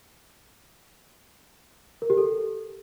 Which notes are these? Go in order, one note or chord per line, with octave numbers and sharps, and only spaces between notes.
A#4
G4
A4